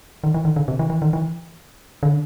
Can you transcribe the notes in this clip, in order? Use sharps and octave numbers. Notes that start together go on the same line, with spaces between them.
D#3
E3
D#3
D3
C3
E3
E3
D#3
E3
D3